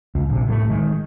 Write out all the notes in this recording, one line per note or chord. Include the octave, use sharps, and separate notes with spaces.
C#2
A#1 C3
A2 G#3 A3
D#3 G#3